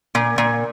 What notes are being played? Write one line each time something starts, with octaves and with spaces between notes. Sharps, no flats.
A#2
A#2